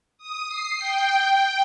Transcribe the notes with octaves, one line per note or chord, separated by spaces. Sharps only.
D#6
C7
G5
G5